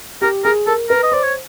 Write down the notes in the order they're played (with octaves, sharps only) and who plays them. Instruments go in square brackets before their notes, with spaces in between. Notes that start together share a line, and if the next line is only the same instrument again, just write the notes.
[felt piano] G4 [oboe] A#4
[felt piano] G#4 [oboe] A#4
[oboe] A4 [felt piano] A#4
[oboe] A#4 [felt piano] B4
[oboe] D#5
[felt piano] C5 [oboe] D5
[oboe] C#5